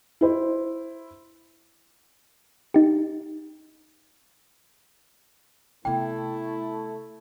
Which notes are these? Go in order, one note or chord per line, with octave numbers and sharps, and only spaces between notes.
E4 C5
D#4 G4
C3 A3 B3 E4 G5